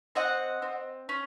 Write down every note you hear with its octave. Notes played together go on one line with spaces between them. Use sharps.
C4 D#5 F#5
C4
C#4